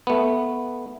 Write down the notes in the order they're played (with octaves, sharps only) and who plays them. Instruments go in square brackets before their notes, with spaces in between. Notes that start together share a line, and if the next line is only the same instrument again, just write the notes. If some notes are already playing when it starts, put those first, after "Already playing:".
[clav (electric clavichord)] A3 B3